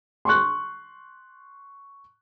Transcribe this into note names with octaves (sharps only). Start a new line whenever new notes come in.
C6 C#6 F#6